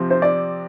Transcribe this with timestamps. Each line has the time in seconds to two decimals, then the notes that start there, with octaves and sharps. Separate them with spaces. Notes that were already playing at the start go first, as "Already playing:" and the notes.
Already playing: C3 F3 C4
0.10 C5
0.22 D5